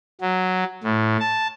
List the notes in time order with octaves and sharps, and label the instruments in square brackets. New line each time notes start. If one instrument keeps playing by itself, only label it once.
[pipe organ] F#3
A2
A5